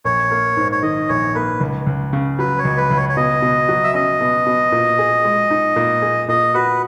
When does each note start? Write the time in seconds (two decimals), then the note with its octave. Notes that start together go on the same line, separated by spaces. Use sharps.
0.05 A#1 C#5
0.31 A#3
0.57 G#2
0.72 C#5
0.82 D#3 D#5
1.09 A#1 C#5
1.35 A#3 B4
1.61 C#2
1.86 C#2
2.13 C#3
2.39 F#3 B4
2.58 C#5
2.65 C#2
2.77 B4
2.91 C#2
2.97 C#5
3.09 C#5
3.17 B2 D#5
3.42 B2
3.69 F#3
3.84 E5
3.94 C#4 D#5
4.21 B2
4.46 B2
4.72 A#2
4.99 G#4
5.24 G#3
5.50 D#4
5.76 A#2
6.02 G#4
6.28 A#2 D#5
6.54 F#4 B4